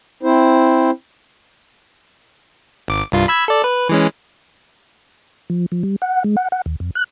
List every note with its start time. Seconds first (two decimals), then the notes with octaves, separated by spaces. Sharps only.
0.23 C4 E4 C5
2.88 G#1 D6
3.12 C2 G2 F4
3.28 B5 E6 G#6
3.48 A4 D5
3.64 B4
3.89 E3 G#3 C#4
5.50 F3
5.72 F3
5.83 G3
6.02 F#5
6.24 G#3
6.37 F#5
6.52 F#5
6.66 D#2
6.80 F2
6.95 F#6